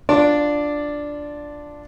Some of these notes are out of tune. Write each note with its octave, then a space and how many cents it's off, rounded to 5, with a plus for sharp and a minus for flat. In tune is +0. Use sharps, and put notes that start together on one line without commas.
D4 +0 F4 +0 D5 +0